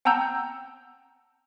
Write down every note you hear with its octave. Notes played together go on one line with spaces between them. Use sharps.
F#5 G5 A5 A#5 E6 G6